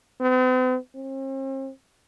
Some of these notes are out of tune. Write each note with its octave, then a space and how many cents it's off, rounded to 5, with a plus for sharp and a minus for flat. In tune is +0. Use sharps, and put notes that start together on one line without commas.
C4 -45
C4 +45